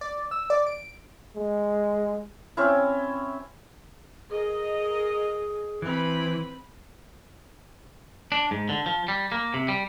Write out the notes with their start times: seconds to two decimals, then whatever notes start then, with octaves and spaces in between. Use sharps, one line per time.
0.01 D5
0.31 E6
0.50 D5
0.67 D7
1.36 G#3
2.57 C4 C#4 E4
4.30 G#4 A#4 D#5
5.82 E3 C4 B4 B5
8.32 D4
8.51 G#2
8.69 D3
8.86 F3
9.08 G3
9.32 A#3
9.54 C3
9.68 G3